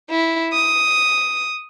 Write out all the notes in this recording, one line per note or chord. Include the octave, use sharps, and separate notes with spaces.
E4
D#6